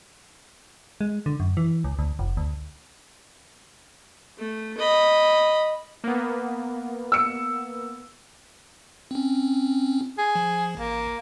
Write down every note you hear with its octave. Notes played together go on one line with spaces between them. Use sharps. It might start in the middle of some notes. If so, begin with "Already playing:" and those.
G#3
D3
F#2
E3
C#2
D2
F1
D2
A3
D#5 B5
A#3 B3
E6 C#7
C4 C#4
G#4
F3
A1 A#3